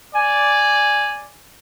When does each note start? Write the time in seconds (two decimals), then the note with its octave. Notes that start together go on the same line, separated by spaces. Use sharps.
0.15 D5 G#5